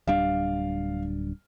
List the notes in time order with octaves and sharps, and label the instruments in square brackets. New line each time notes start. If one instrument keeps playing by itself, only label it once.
[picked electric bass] D1 G3 D4 [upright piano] F5